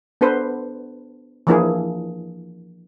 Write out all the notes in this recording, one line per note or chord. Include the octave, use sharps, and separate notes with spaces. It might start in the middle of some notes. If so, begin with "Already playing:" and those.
B3 D4 A4 B4 C5
E3 F3 A#3 D4 E4 G#4